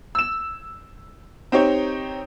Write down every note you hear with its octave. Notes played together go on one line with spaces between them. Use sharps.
E6 E7
C4 D#4 G4 C#5